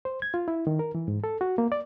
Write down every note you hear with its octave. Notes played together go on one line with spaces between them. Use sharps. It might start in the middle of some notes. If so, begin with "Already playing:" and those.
C5
G#6
F4
E4
D#3
A#4
E3
G#2
A4
F#4
A#3
D5